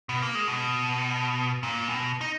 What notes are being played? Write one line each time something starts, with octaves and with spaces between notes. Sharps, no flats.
B2
A#3
G#3
B2
A#2
B2
D#4